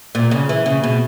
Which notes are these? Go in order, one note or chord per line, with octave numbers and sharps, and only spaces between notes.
A#2
C#3
E3
C#3
B2